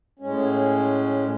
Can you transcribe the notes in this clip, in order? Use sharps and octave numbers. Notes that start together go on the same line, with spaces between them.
A2 G#3 C#4